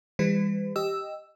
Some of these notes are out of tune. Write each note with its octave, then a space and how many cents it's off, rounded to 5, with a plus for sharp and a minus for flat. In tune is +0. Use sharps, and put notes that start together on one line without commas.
E3 +0 G3 +45 B4 +40
G4 +0 D#5 +0 E6 +0